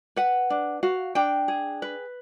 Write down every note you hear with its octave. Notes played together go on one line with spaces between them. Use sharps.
B4 F#5
D4
F#4 F5
D4 G5
G#4
B4